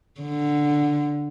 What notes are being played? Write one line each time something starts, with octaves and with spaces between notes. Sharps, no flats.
D3